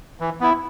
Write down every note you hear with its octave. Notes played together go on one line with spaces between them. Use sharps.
E3
B3 E4